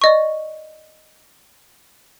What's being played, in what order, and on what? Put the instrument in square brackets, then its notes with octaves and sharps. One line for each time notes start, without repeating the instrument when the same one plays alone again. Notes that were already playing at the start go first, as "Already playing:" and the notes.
[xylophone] D5 D#5 C#6